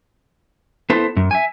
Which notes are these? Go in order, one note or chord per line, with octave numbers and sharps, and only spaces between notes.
B3 E4 A4 C5
F#2
E5 G#5